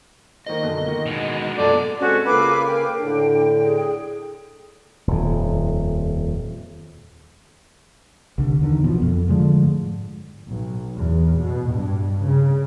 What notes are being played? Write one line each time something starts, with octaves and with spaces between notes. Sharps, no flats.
D#3 A#3 C5 D#5
B1 F#2 D3
D#3 A#3
B2 G#3
F#2 A#2 A4 D5 D#7
G#3 C4 C#4 F#4 A4 C5
C#3 A#3 F4 A4 B4 G#5 D6
A#4 G5
A2 D3 D4
G#4
D#1 F2
C2 D3
E2 D3 D#3
B2 F3
F2
D3 F3 G#3 A3
G#2
B1
E2
B2
G2
C#3